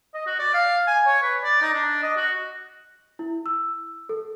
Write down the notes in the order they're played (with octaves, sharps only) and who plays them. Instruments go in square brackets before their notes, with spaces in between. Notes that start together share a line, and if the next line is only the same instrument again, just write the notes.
[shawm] D#5
F#4
D5
F5
G#5
C#5
B4
D5
D#4
D4
D#5
F#4
[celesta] E4
E6
A4